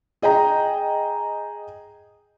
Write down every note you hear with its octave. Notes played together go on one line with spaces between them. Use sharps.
G#4 D#5 G5 A#5